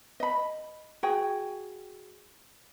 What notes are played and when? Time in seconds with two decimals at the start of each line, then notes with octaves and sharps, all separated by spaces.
0.20 D#5 B5
1.03 F#4 G#4 G5